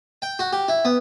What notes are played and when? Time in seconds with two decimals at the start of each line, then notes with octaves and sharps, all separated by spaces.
0.22 G5
0.39 F#4
0.53 G4
0.68 E4
0.85 B3